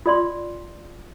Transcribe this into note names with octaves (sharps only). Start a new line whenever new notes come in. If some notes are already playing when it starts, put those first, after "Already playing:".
F4 D5 C6